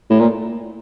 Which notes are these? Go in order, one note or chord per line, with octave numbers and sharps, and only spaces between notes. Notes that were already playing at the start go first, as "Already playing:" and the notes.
A2
A#2